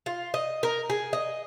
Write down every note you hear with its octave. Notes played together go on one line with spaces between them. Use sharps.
F4
D#5
A#4
G#4
D#5